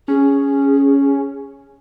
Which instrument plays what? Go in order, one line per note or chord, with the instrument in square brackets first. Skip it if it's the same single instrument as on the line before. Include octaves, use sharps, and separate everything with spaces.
[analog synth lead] C#4 [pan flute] G#4